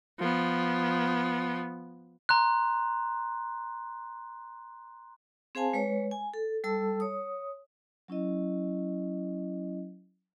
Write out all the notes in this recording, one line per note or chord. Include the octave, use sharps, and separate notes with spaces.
F3 B3
A#5 C6 F#6
C4 G#4 C5 F5 G#5 A5
G#3 B4 C#5
G#5
A4
G3 A4 A5 E6
C#5 D#6
F#3 C#4 E4 D#5